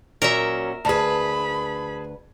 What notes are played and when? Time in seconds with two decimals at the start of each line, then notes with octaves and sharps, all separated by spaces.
0.22 A#2 F#3 C#4 A#4 E5
0.85 D2 G#4 B4 A5 B5